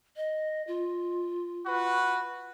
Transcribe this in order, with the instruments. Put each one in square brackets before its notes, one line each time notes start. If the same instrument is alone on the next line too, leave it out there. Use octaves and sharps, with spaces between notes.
[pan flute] D#5
F4
[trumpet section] F#4 B4